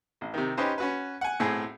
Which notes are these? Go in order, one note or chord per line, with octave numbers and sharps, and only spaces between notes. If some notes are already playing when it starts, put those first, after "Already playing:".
A1
C3 D#3
C#4 D#4 G4 B4 C5
C#4 F#4 B4
F#5 G#5
B1 A2 C4 G#4